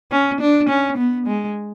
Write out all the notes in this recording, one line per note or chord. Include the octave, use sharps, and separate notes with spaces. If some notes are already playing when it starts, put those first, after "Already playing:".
C#4
D4
C#4
B3
G#3